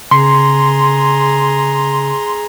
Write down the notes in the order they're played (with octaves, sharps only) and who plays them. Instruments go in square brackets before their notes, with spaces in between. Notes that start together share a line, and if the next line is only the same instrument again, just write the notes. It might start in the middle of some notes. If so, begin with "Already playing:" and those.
[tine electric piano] C#3 [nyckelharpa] G#4 A#5 [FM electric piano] C6